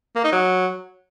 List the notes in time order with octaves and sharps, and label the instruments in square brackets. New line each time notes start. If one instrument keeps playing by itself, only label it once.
[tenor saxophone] A#3
D#4
F#3